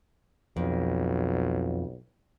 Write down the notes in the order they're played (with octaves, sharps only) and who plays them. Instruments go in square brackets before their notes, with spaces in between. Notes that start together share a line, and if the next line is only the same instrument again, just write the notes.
[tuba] B1 [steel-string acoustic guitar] F2